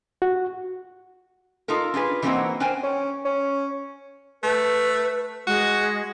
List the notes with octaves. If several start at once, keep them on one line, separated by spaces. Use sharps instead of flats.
F#4
D#4 F4 A4 A#4
D4 F4 G#4 B4
E3 G3 A#3 C4 D#4 F#4
D4 A#4 C5 G5 G#5
C#4
C#4
A3 B4
G#3 F#4